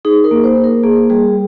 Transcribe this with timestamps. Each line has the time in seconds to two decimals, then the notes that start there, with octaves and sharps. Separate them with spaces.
0.05 D#4 G#4
0.24 A#4
0.31 A#3
0.44 C5
0.58 A#3
0.64 A#4
0.83 A#3 G#4
1.10 G3 G#4